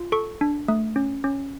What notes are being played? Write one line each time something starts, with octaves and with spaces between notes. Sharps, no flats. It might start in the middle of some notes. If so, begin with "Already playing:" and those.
Already playing: F4
A4 C#6
D4
A3
C#4
C#4